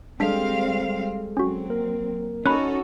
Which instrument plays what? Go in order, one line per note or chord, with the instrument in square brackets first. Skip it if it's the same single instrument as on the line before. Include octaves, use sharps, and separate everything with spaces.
[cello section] G3 C4 F5 [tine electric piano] G#3 G#4 A4 [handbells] D4 B6
[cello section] F#3 C4 [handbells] C#4 F#4
[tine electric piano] A#3 A#4
[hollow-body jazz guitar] C#4 [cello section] D#4 F#4 A4 [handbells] B5 F#6